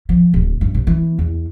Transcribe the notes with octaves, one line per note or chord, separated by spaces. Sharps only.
F3
D1
G2
C3
E3
E2